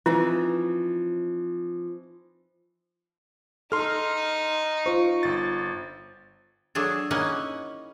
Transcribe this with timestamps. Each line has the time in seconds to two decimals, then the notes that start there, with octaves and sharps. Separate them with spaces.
0.06 E3 F3 C4 D#4 E4
3.72 D#4 A4 C6 F6
4.86 F4 C5 C#6
5.23 G1 A6
6.75 F#3 A3 D4 G#4 A4
7.11 A#3 C#4 D#4 E4 F#5 G#5